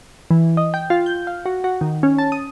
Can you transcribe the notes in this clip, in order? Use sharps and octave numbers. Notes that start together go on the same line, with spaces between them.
E3
D#5
G5
F4
G6
F5
F#4
F#4
D#3
C#4
A5
D#6